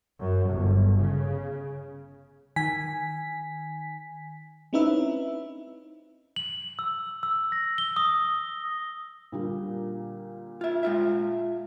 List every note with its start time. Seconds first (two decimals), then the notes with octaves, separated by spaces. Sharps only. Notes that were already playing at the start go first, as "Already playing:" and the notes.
0.20 F#2
0.52 G1
1.00 C#3
2.56 D#3 G#5 B6
4.73 C4 C#4 D#4 E4 B4 E5
6.36 F#7
6.79 E6
7.23 E6
7.52 A#6
7.78 G7
7.96 D#6
9.32 A#2 D3 G3
10.61 F4 E5
10.83 G#3 F4 E5